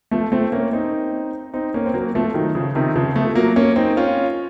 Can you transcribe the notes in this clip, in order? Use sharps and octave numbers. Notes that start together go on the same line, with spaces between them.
F3 A3
A3 C4
A#3 C#4
C4 D#4
C4 D#4
A#3 C#4
C4
F#3 A#3
F3 A3
D#3 F#3
C#3 F3
C3 D#3
C#3 F3
F3 A3
F#3 A#3
A#3 C#4
C4 D#4
C#4 F4